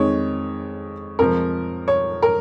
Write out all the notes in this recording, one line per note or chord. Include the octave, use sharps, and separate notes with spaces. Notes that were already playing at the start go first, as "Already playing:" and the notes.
Already playing: F2 D#3 G#3 C#5
F2 F3 G#3 A#4
C#5
A#4